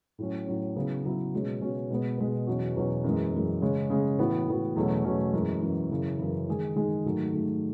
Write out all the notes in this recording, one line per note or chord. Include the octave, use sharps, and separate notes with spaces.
A2 F#3 C#4
A2 F#3 C#4
C#3 F#3 B3 E4
C#3 F#3 B3 E4
B2 G#3 C#4 F#4
B2 G#3 C#4 F#4
B2 G#3 B3
B2 G#3 B3
E2 B2 F#3 C#4 F#4
E2 B2 F#3 C#4 F#4
F#2 E3 G#3
F#2 E3 G#3
C#3 G#3 C#4
C#3 G#3 C#4
A2 E3 B3 F#4
A2 E3 B3 F#4
E2 B2 F#3 A3 C#4
E2 B2 F#3 A3 C#4
F#2 E3 G#3
F#2 E3 G#3
F#2 C#3 E3
F#2 C#3 E3
D#3 G#3 D#4 G#4
D#3 G#3 D#4 G#4
G#2 D#3 F#3 A3
G#2 D#3 F#3 A3